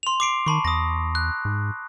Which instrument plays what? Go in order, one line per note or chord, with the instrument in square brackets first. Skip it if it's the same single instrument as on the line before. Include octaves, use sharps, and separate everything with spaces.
[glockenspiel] C6 F7
D6 C7 D7
[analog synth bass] D#3 [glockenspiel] A5 B5 C#6
[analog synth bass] E2 [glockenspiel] D#6 A#6
[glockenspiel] F#6
[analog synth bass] G#2